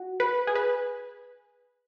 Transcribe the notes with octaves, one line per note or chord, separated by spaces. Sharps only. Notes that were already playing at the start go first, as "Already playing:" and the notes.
Already playing: F#4
B4
G#4
B4